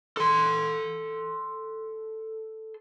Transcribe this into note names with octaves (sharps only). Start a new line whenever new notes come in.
A4 C6